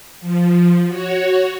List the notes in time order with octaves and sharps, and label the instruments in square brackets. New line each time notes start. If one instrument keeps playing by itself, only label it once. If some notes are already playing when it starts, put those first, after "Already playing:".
[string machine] F3
F#4 C#5